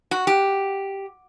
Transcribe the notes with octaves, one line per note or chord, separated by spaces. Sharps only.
F#4
G4